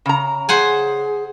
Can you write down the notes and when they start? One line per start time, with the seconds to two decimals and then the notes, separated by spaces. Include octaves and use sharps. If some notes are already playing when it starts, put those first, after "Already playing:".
0.06 C#3 A#5
0.49 G#4 C5 F#5 G#5